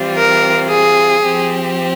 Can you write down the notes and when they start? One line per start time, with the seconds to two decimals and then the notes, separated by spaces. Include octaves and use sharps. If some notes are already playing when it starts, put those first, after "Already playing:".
Already playing: E3 G3 C4 F4
0.17 A#4
0.69 G#4
1.22 F3 C4 G4